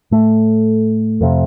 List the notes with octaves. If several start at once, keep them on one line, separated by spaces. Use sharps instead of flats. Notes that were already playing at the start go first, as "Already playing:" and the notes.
A2 A3
F2 C3